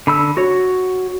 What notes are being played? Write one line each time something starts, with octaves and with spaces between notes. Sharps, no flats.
D3 B5 E6
F#4 C#5